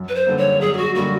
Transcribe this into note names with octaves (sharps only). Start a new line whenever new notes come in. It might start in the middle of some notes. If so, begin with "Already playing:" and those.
Already playing: F#2
B4
C5
D3 G3 A#3
C#5
F#2 G#4
G4
F#4
D3 G3 A#3 F#4